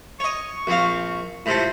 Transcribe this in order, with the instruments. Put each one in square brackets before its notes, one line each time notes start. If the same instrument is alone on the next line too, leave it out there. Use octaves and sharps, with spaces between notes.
[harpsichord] C#5 D#5 [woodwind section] C#6
[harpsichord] A#1 C4 F5
[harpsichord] A2 C3 A4 [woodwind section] F4 C5